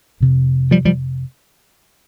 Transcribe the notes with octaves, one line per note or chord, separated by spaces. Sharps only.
F2 C3
F3 G3
F3 G3